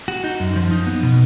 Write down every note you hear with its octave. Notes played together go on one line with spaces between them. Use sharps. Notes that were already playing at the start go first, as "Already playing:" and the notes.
F#4
D#4
F#2
F3
D#4
B3
B2